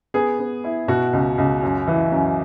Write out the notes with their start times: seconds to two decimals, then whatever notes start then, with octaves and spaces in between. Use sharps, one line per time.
0.14 B3 G#4
0.39 B3
0.64 E4
0.88 B2 F#4
1.13 C#2
1.38 C#2
1.62 F#2
1.88 E3
2.12 F#2